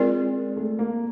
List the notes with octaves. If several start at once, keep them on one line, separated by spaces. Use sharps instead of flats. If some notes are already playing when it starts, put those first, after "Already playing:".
Already playing: G#3 C4 F4 A#4 D5
A3
A#3